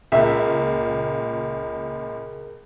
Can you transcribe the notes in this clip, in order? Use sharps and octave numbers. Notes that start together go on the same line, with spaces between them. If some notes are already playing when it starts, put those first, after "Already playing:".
C#2 A#2 G#4 A#4 E5